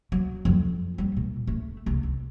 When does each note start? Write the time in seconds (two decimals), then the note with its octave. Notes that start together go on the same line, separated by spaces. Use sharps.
0.12 F#3
0.45 F2
0.98 G3
1.17 A#2
1.47 A3
1.86 C2
2.03 C2